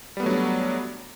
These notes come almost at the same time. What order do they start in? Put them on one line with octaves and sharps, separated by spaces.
G3 B3 A3 F#3 D4